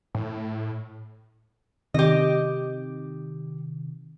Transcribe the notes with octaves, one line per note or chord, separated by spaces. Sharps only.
A2
C3 D#3 G4 D#5